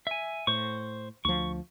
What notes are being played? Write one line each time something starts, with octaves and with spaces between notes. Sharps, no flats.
E5 G#5
A2 C5 C#6
D2 F3 C#6